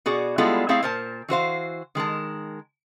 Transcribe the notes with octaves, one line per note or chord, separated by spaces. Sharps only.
B2 F#4 G#4 D5
G3 G#3 B3 E4 F4 A4
A3 C4 E4 G#4 E5 F5
A#2 A#4 C5 A5
E3 F#4 C5 F5
D#3 G#3 A#4 A5